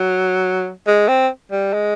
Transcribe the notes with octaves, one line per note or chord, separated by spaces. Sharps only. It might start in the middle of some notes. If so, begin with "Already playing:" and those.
Already playing: F#3
G#3
C4
G3
G#3